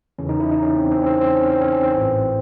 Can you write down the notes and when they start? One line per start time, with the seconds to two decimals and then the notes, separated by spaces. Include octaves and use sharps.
0.18 E2 C#3 E3 C#4
0.29 D#4
0.40 E4
0.51 D#4
0.62 C#4
0.77 C4
0.91 C4
1.02 C#4
1.06 C4
1.21 C4
1.36 C#4
1.50 C4
1.61 C#4
1.72 C4
1.83 C4
1.94 A1 G#2 E3